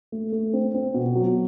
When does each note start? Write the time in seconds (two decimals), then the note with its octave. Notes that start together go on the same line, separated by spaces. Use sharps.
0.12 A3
0.32 A3
0.53 C4
0.74 C4
0.94 B2
1.15 F#3